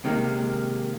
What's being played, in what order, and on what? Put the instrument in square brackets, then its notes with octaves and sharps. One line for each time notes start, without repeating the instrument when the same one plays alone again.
[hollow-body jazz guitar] C3 D#3 G#3 A#3